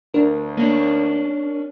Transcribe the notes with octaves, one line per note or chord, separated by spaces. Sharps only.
D2 D4 A#4
A#3 C#4 D4